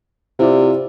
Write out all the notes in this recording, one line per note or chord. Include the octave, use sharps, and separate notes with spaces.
C3 E4 F4 D5